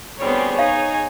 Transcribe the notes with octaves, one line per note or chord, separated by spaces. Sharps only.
D2 G3 B3 C4 G#4 C#5
D#4 F5 G#5